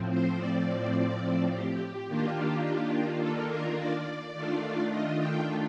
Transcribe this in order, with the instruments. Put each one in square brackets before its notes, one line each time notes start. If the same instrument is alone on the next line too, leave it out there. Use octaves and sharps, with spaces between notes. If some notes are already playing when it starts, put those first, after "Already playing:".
Already playing: [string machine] A2 F3 C4
C5
D5
G4
D#3 A#3 D4 F4
A4
A#4
D5
D#3 A3 D4 F4
D#5
G5